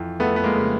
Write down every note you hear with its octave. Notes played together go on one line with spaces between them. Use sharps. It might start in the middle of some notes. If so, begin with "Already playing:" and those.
Already playing: F2 E3
F2 A3 B3
B3
G#3 A#3
C#3